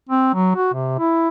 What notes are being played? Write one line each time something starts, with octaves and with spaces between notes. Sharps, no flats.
C4
F#3
F#4
C3
E4